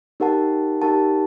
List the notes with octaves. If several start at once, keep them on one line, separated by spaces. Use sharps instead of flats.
D#4 G4 A#4 F#5 A5
D#4 G4 A#4 F#5 A5